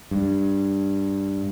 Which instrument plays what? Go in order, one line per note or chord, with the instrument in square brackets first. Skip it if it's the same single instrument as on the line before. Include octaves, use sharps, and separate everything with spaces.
[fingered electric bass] G2